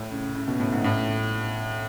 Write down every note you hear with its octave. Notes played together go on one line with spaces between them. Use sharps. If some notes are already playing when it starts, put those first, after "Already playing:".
Already playing: A2
C#3
C#3
B2
A2
G#2
A2